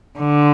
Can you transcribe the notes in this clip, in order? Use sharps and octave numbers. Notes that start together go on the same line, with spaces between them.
D3